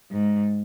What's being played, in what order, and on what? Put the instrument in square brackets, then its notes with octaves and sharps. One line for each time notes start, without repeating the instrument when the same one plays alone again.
[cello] G#2